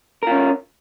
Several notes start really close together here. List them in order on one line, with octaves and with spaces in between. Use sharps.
A#4 F4 C#4